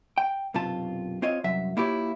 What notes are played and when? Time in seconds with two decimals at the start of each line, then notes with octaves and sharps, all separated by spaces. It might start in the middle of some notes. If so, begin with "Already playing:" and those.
0.18 G5
0.54 B1 F#2 C3 F4 A5
1.22 C4 F4 C#5 D#5
1.44 C2 F#2 F#3 E5
1.77 A#3 E4 F4 G4 C#5